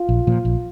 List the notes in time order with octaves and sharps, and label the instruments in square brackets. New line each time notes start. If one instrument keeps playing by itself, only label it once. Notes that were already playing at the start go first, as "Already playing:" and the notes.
Already playing: [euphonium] F4
[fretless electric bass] A#1
A#2 F3
A#1